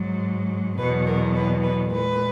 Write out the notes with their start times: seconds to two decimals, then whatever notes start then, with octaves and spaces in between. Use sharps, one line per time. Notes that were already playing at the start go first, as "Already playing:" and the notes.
Already playing: G#2 F#3
0.77 E2 B2 F#3 B4
1.06 A#4
1.35 B4
1.63 B4
1.91 A#2 G#3 B4